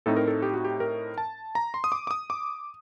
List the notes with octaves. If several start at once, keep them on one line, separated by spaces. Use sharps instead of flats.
A2 A3 C4 D#4 A4
A#4
A4
G4
F#4
G4
A#4
A5
A#5
C6
D#6
D6
D6
D#6
D6